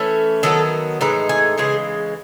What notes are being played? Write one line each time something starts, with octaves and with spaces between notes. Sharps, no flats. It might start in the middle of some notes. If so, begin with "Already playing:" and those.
Already playing: E3 A3 C#4
D#3 F#3 B3 A4
A2 E3 G#3 D#4 B4
G#4
C#3 E3 G#3 G#4